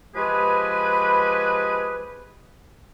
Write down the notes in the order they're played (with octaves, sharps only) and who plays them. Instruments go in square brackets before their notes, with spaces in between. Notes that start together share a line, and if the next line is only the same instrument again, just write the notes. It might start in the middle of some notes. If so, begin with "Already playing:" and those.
[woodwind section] F3 G#3 G4 G#4 B4